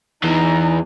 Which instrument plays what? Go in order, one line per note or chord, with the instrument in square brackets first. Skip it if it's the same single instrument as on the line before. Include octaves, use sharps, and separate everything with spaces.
[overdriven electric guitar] E2 E3 [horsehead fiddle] D#4 A#5